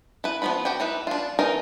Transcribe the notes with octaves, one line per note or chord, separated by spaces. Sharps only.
E4 B4
F3 B3 C4 F4 B5
F#4 G4 G5
D#4 E4 B4
D4 F4
E3 D#4 A#4